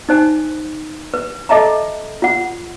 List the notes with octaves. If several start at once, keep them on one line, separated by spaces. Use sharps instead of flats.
D#4 C5 G#5
B4
A4 D#5 E5 A5 A#5
F4 F#5